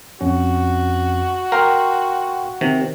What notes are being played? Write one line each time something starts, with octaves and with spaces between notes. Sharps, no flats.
F2 C#4 F#4
A#4 F5 G5 C6
C3 D#3